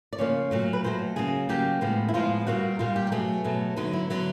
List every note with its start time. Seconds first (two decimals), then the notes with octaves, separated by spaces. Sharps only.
0.13 D5
0.18 C#3 F3 A#3 C#5
0.51 A#2 F#3 A3
0.73 B4
0.84 A#2 F#3 A3 C5
1.16 C#3 F#3 A#3 G#4
1.49 C#3 F#3 A#3 G4
1.81 A2 F3 G#3 B3
2.09 E4
2.14 A2 F3 G#3 B3 F4
2.46 A#2 G3 A#3 F#4
2.79 A#2 G3 A#3 F4
2.96 G4
3.07 G4
3.12 B2 F#3 A3 G#4
3.44 B2 F#3 A3
3.76 D3 F#3 B3 D#4
3.93 E4
4.10 D3 F#3 B3